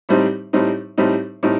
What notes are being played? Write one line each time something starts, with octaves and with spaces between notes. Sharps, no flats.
A2 G3 C4 D#4
A2 G3 C4 D#4
A2 G3 C4 D#4
A2 G3 C4 D#4